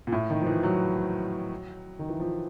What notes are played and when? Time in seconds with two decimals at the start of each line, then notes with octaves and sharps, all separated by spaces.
0.07 A#2
0.12 A2
0.30 D#3
0.42 F3
0.47 E3
0.63 F#3
1.99 D#3
2.09 E3
2.20 F3